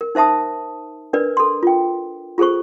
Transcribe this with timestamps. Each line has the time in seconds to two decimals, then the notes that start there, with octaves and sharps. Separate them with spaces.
0.01 A#4
0.15 D#4 C5 E5 A5 D#6
1.13 D4 A#4 B4 D5
1.37 A4 C6
1.63 F4 G5
2.38 F4 G#4 A4 C5 C#6